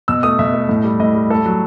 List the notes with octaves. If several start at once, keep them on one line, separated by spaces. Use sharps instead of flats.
B2 E6
A3 D#6
B2 E5
A3
A2
G3
A2 D#5
G3
A3 A4
F#3